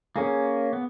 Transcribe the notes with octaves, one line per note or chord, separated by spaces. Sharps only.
A#3 C#4 G#4
B3